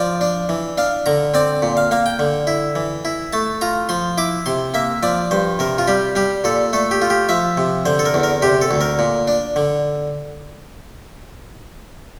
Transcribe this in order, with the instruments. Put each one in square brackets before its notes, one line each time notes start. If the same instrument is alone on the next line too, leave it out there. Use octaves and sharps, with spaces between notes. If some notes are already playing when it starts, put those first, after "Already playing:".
Already playing: [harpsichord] F3 D5
D4
E3
D4 F5
D3 A#5
C4 D5
A#2
F5
A#3 F5
G5
D3
E4
E3
E4
A3 A5
F4 A#5
F3 C6
E4 D6
C3 C6
A#3 E5
F3 D5
G2 C5
C3 A#4
F4
G3 G4
G3 G4
A#2 A4
A3 A4
G4
F4
G4
F3 E5
C3
D3 C5
A4
A#4
E2
A#4
C3 G4
A4
D2
A#4
A#2
D4
D3